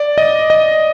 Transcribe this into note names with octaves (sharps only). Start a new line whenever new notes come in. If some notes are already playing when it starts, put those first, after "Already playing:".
Already playing: D5
D#5
D#5